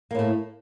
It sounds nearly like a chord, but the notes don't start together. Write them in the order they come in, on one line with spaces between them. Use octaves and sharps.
A#3 A2 A3